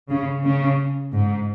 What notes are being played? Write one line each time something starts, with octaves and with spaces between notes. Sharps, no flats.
C#3
C#3
G#2